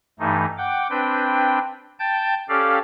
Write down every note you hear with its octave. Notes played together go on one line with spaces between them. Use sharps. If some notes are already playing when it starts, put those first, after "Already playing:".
G2 E3 A3 D#4
F#5 G5 D6
C4 D4 B4 G5
G5 A5 G6
C#4 G4 A4 D5 F5